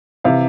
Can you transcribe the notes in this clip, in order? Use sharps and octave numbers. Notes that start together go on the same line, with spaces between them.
C3 E3 F5